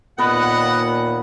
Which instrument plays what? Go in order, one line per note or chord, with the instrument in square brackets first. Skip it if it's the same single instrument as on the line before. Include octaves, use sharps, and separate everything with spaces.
[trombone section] D#2 A#2 [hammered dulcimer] B3 B4 [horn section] D#5 F#5